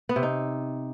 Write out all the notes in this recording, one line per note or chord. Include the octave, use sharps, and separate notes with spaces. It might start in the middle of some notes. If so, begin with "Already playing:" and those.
B3
C3
D#4